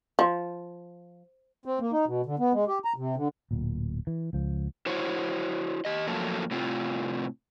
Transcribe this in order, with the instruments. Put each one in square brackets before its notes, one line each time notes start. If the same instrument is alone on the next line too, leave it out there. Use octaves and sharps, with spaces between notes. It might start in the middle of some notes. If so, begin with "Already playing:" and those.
[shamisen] F3
[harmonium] C4
A#3
D#4
B2
D3
B3
G#3
G4
A#5
C3
D3
[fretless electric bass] D1 A#2
E3
C#2 F3
[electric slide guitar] E4 F#4 C5 C#5
G4 D#5
F2 F3 F#3 A3 A#3 A4
A2 C3 C4 F4